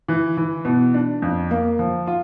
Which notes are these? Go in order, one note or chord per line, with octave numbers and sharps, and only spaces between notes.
E3
E3
B2
D4
F2
A#3
F3
F4